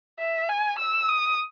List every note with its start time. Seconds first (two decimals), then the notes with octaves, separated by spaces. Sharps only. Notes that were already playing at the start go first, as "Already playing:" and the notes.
0.19 E5
0.49 G#5
0.79 E6
1.08 D#6